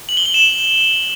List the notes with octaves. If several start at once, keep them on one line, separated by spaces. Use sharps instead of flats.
F#7
G7
F#7
E7